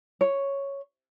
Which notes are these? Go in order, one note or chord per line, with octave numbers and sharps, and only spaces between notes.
C#5